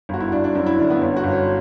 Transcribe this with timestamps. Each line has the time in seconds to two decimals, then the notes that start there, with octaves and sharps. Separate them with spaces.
0.09 G1 F#4
0.20 E4
0.32 G1 D4
0.44 D4
0.55 F#2 E4
0.66 E4
0.78 D3 D4
0.90 B3
1.01 G1 C#4
1.17 F#4
1.24 G1
1.32 C#4